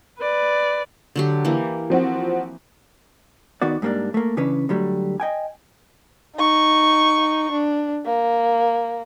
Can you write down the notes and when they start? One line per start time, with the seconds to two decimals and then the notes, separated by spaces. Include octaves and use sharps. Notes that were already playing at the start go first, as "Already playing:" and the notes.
0.19 B4 D5
1.16 D3 F#3 G4
1.45 E3 A#3
1.90 F3 C4 F#4
3.62 D#3 B3 F#4 D5
3.82 G#2 G3 A#3 B3 D4
4.14 A3 A#3
4.37 C#3 E3 C#4 D4 B4
4.69 D3 F#3 G3 A3
5.20 D#5 G5 G#5
6.36 D#4 C#6
7.51 D4
8.06 A#3